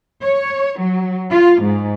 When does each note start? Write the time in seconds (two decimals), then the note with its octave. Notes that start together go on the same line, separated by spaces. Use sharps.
0.22 C#5
0.79 F#3
1.30 F4
1.61 G#2